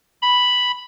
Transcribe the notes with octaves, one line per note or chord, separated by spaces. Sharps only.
B5